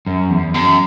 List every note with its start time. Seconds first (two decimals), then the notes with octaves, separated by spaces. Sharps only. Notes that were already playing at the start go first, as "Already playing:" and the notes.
0.07 F#2
0.30 E2
0.54 F#2